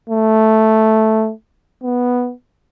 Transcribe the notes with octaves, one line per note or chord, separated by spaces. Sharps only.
A3
B3